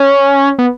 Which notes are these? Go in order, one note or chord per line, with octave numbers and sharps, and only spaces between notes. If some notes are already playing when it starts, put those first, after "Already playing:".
Already playing: C#4
B3